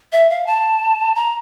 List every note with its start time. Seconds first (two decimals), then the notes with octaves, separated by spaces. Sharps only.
0.12 E5
0.30 F5
0.47 A5
1.15 A#5